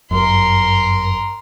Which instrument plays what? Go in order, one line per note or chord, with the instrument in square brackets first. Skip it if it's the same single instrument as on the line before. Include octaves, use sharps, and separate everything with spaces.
[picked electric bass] G1 F#2 [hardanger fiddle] A#4 C6